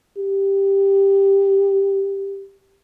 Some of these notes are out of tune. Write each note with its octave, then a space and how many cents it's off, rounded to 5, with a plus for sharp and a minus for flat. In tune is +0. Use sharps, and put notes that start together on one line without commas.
G4 +5